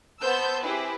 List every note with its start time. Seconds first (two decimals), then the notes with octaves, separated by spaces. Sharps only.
0.21 B3 C5 A5 E6 G6
0.62 C4 E4 G4 G#4 B4